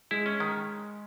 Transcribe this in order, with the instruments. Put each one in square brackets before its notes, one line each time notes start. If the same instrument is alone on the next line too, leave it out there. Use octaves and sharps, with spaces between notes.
[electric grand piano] G#3 [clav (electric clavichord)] E4
[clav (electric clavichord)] C#4
D#3